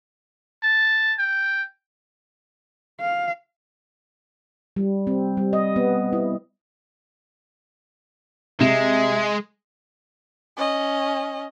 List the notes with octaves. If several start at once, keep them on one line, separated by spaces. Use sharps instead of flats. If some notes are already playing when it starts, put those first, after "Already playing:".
A5
G5
F5
G3
C4
G3
D#5
B3
E4
C3 G#3 E5 E7
C#4 D#5